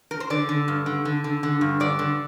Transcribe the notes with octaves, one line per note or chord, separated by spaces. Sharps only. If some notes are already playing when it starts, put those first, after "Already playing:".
A#4
C5
D3 D5
D3
G2
D3
D3
D3
D3
G2
D3 D5
D3